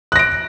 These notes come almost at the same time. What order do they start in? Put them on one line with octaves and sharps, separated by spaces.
F#6 A#6 D7